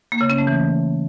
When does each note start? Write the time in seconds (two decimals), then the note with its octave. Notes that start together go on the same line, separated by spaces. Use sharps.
0.12 A#3
0.21 C#3
0.30 C#4
0.38 A3
0.47 E3